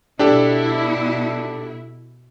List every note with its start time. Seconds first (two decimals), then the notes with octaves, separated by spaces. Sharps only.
0.19 B2 D4 E4 G4 A4